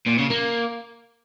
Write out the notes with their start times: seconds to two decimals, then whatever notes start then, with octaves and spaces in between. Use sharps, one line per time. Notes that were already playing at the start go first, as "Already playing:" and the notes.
0.07 A#2
0.19 C#3
0.30 A#3